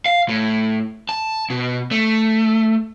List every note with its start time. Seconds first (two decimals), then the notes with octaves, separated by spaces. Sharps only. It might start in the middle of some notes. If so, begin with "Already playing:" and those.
0.06 F5
0.29 A2
1.09 A5
1.50 B2
1.91 A3